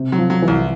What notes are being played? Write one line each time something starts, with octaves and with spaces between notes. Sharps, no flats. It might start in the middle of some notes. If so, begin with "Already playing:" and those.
Already playing: C3
F#3
F3
F#3
E3
C2